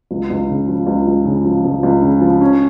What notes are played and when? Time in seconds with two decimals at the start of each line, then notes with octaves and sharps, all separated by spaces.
0.11 C#2
0.30 C#2
0.48 C#3
0.69 F3
0.87 C#2
1.07 C#2
1.25 C#3
1.45 F3
1.65 C#2
1.83 C#2
2.02 C#3
2.21 F3
2.41 C#4